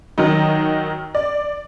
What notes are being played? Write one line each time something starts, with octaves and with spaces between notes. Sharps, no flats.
D#3 F#3 D#4
D5